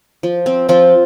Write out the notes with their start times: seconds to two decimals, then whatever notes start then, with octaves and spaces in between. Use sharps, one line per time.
0.23 F3
0.46 C4
0.69 F3 C4 F4